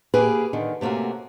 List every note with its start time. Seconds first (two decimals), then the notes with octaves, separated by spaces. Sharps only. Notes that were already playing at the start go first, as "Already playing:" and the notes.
0.14 A#3 G4 G#4 B4
0.53 D3 D#3
0.81 C3 A3 A#3 C#4 F#4